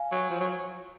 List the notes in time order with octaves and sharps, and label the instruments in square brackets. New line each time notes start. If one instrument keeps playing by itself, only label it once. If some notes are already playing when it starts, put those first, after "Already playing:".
Already playing: [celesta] F5 G#5
[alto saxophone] F#3
F3
F#3